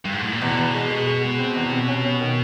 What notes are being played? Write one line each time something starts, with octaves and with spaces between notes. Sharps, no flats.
G2
G#2
A2
A#2
E2 B2
E2
G#3
G#3
G#3
G#3
C4
E2
C3
C#4
C#4
D#3